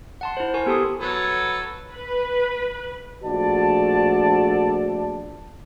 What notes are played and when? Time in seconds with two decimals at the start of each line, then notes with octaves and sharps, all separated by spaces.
0.21 F#5 A5 C6
0.37 E4 C5
0.54 A#4 G#5 C#6
0.66 B3 G4 A4 A5 C6 D#6
1.01 F#3 A4 B4
1.95 B4
3.25 A#1 A3 F#4 A4 D5 A5